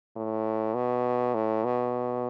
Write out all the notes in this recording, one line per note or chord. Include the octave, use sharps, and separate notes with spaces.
A2
B2
A2
B2